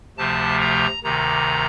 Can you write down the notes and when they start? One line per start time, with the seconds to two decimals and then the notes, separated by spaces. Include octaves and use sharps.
0.17 D2 C3 F3 A3 A5
0.61 A#5
1.04 D2 C3 D#3 A#5